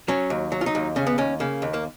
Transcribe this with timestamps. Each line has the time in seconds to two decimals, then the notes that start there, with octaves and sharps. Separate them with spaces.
0.08 F#3 C#4
0.30 D#2
0.52 F#3
0.61 F4
0.66 D#4
0.75 D#2
0.96 C#3 C#4
1.07 B3
1.18 D#2 C#4
1.40 C#3 A#3
1.62 D#2
1.74 A#3